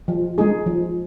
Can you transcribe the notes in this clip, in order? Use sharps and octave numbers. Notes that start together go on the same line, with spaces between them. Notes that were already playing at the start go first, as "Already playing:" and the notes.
F3
G#3 D#4 G#4
F3